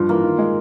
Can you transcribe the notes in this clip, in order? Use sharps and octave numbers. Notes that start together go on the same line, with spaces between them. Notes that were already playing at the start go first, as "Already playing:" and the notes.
Already playing: G2 F3 F4
E3 A#3
D#3
G#3